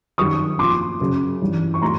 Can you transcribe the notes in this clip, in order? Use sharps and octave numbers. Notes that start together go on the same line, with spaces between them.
F#2 D#3 G3 C#6 D#6
A#2 F3 C6 D6
F#2 C#3 F#3
G2 E3 G3
C#6
A2 F#3 A#5 C6